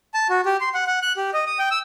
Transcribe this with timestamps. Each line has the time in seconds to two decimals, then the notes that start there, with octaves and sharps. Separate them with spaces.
0.14 A5
0.29 F#4
0.46 G4
0.61 C6
0.74 F#5
0.87 F#5
1.02 F#6
1.17 G4
1.33 D#5
1.47 D#6
1.59 G5
1.71 E6